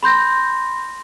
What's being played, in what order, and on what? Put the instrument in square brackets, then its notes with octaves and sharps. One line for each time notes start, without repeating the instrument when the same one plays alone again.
[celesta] B5 C6 G6 A#6